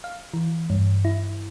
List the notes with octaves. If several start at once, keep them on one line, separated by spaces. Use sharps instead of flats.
F5
E3
G2
E4